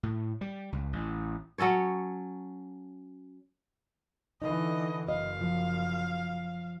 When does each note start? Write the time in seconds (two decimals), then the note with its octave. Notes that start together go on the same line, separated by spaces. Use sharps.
0.03 A2
0.41 G3
0.72 C#2
0.93 A1
1.58 F#3 C#4 A4 C#5
4.42 D3 E3 D#4 D#5
5.08 F#1 D#5 F5
5.41 F3